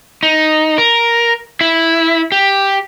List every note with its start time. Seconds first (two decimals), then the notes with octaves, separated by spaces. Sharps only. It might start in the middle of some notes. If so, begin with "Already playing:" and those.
0.23 D#4
0.78 A#4
1.61 E4
2.32 G4